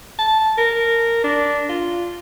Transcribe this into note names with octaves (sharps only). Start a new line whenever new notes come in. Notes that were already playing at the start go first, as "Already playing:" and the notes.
A5
A#4
D4
F4